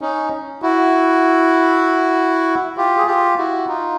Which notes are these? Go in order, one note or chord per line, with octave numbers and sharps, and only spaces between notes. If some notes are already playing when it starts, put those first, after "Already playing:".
C#4 D#4
E4 F#4
F4 G4
G#4
F4 G4
E4 F#4
D#4 F4